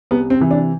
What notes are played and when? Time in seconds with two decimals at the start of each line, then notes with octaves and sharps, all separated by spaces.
0.11 C2 B3
0.30 C4
0.40 C3 E3
0.51 D4